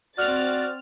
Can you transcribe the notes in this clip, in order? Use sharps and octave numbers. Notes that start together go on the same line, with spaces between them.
C4 F#4 D5 F6 A6 F7